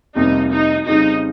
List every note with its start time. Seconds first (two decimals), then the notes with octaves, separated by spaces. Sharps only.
0.15 F1 F2 C3 G3 A#3 D#4
0.51 D#4
0.87 F2 C#3 G3 C4 D#4